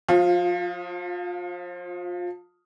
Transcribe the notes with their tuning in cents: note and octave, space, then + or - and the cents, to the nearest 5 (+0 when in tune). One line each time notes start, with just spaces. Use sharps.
F3 +30 F4 +0